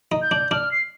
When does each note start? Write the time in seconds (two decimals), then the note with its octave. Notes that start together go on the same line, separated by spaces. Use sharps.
0.12 D#4
0.22 G6
0.31 D4
0.51 D4 F6
0.71 C7